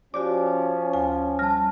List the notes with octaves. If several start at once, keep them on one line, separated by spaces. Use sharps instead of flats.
F3 C#4 F#4 G4 D5 D6
D2 G#5
G3 A5 F6